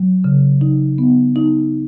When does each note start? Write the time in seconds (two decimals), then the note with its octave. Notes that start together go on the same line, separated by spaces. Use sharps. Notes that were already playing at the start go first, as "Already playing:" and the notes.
Already playing: F#3
0.24 C#3
0.61 D#4
0.98 B3
1.36 D#4